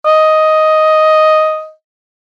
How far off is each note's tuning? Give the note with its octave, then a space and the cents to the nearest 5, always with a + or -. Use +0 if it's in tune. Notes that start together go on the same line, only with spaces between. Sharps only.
D#5 +5